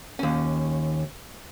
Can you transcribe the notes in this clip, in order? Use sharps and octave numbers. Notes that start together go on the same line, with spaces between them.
D#2 C#4